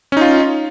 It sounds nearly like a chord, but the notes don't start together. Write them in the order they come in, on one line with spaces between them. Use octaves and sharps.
C#4 D#4 F4